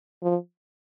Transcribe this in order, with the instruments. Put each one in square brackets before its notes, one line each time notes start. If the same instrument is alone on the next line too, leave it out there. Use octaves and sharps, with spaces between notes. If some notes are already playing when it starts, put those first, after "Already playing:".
[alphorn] F3